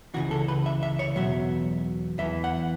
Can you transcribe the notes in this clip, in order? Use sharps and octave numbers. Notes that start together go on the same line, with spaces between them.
C#2 C#3 E3 F#4
A4
B4
E5
E5
C#5
E2 B2 F#3 E5
E2 E3 E5
F#5